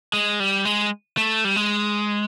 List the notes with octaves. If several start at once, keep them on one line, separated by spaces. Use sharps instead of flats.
G#3
G3
G#3
A3
G3
G#3